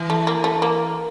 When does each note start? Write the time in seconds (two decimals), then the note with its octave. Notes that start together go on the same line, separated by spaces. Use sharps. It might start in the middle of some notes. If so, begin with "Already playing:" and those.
Already playing: E3
0.10 A3
0.27 A#3
0.44 A3
0.62 A#3